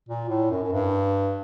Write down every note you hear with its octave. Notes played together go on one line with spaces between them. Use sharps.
A#2
A2
F#2
F#2
G2